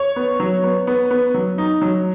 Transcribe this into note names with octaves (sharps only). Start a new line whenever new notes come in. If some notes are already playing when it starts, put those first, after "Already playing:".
Already playing: C#5
B3
F#3
B3
B3
B3
F#3
D#4
F#3